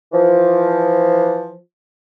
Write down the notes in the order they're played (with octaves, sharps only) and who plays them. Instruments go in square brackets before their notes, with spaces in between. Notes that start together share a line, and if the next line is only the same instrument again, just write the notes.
[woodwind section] E3 F3